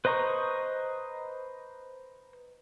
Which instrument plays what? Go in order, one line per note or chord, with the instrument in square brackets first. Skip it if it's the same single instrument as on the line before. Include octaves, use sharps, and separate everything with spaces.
[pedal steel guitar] B4 C5 D#5 A#5 C#6